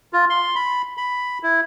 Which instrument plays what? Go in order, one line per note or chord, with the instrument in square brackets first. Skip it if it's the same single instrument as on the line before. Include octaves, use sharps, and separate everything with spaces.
[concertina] F4
C6
B5
B5
E4